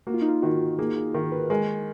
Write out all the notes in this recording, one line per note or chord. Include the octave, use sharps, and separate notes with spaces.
A#3 F#4
F4
D#4
F4
D#3 F#4
A#3 G#4
G#4
D#3 A#4
B4
G#3 A#4